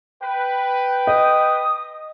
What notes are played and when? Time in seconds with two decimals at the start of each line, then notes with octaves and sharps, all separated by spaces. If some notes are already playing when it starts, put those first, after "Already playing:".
0.22 B4 G5
1.07 D#5 D#6